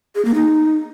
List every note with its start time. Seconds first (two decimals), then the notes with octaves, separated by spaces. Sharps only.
0.15 G#4
0.25 A#3
0.35 D#4